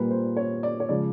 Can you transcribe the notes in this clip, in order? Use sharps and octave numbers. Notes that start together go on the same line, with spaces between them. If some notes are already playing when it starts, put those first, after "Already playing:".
Already playing: A#2 G3 A#3 B4
C5
C#5
D5
C#5
C#3 F3 G#3 D5